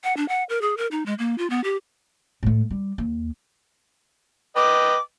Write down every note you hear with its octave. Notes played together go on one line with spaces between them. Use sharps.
F#5
D4
F#5
A#4
G#4
A#4
D#4
G#3
A#3
F4
B3
G4
A2 A3
G3
D#2
B4 D#5 G5 D6